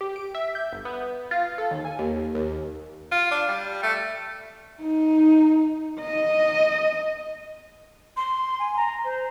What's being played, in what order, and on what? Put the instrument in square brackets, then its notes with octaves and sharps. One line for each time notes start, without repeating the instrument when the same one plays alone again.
[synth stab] G4
D7
E5
G6
G1
B3
F4
A4
D#2
G#5
D#2
D#2
[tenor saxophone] F4
D4
G3
A3
[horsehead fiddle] D#4
D#5
[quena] C6
G#5
A#5
C5